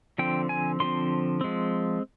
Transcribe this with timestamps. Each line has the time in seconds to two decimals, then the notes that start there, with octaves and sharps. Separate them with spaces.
0.18 D3 F3 C4 G5
0.49 G#5
0.80 D3 F3 C4 C6
1.41 F3 G#3 C4